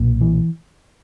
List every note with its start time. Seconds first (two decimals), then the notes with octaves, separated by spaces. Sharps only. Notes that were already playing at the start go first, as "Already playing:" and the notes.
Already playing: B1 A#2
0.21 E3